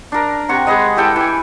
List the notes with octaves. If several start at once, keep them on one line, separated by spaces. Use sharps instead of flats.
D4 A#4
C3 F#5 C#6
G#3 G#4 B4 D#5
E3 G4 A4 G5
E3 G#5